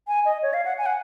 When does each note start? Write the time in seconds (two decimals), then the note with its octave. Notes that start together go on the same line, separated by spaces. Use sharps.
0.08 G#5
0.25 D#5
0.43 C#5
0.53 F5
0.65 F#5
0.78 G#5
0.86 F#5